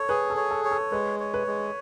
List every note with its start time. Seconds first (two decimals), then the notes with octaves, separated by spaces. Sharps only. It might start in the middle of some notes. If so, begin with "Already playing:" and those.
Already playing: A4 C#5
0.09 G#4 B4
0.30 A4
0.37 C#5
0.51 A4
0.65 C#5
0.71 A4
0.92 G#3 B4
1.20 C#5
1.34 B4
1.47 G#3